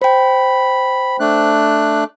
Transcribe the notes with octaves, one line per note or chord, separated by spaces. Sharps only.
C5 G5 B5
A3 D4 F#6